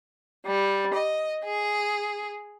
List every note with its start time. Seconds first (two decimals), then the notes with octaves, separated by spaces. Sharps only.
0.48 G3
0.94 D#5
1.46 G#4